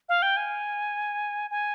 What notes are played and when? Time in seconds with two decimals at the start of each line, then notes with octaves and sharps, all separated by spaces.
0.09 F5
0.22 G5
0.37 G#5
1.51 G#5